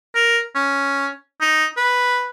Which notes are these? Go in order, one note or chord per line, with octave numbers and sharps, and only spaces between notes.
A#4
C#4
D#4
B4